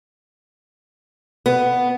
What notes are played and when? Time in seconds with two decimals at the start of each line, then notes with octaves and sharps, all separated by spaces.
1.46 B3